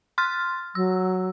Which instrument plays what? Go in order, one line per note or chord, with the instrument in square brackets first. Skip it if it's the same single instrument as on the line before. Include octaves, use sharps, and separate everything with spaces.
[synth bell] C6 F6 A6
[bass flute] F#3 [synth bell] E6